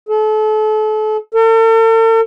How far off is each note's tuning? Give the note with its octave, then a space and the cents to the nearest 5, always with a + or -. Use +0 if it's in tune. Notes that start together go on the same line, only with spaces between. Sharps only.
A4 -35
A4 +45